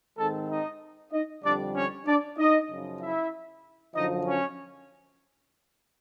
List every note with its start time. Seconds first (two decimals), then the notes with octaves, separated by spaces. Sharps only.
0.18 G#2 D#3 G#3 C4 A4 A5
0.50 D#4 D#5
1.12 D#4 D#5
1.43 F2 D3 G3 D4 D5
1.75 C#4 C#5
2.07 D4 D5
2.38 D#4 D#5
2.70 F#2 C#3 F3
3.00 E4 E5
3.95 F#2 D3 F3 D#4 D#5
4.26 C#4 C#5